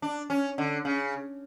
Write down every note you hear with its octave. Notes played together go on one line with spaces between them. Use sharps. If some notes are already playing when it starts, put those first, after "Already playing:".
D4
C#4
D3
C#3